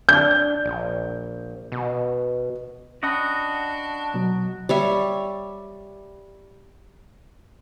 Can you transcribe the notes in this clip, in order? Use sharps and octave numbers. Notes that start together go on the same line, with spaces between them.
D4 G6
A#1
B2
C#4 D4 F#4 D#5 F#5 A5 B5
B2 F#3
G3 C#5 E5